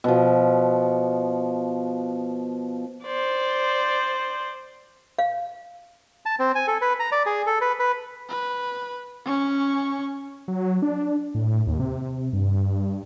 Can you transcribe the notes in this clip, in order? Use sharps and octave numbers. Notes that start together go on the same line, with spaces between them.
B2 F3
C5 D5
F5
A5
C4
G#5
A4
B4
A#5
D5
G#4
A4
B4
B4
B4
C#4 C#6
F#3
D4
A2
D#2
C3
G2